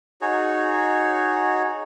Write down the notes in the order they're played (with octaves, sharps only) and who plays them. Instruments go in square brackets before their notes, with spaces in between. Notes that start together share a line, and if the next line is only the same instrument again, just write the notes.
[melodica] D#4 F#4 G#4 C#5